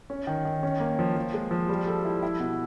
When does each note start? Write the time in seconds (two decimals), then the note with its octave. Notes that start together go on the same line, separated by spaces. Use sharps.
0.10 C#4
0.27 D#3
0.45 D#3
0.63 C#4
0.80 A#3
0.99 F3
1.17 F3
1.34 G#3
1.51 F3
1.69 G3
1.87 A4
2.05 E4
2.23 E4
2.40 B2